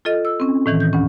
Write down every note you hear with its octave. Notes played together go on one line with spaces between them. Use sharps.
F4 A4 D#5
E6
C4 C#4
A2 D#3 E3
G6
D2 G2 C#4